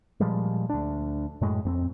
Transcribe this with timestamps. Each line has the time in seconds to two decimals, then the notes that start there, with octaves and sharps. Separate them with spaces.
0.20 A#2 F3 G3 G#3
0.69 D2 D4
1.41 F#2 A2 G#3
1.65 F2 B3 C4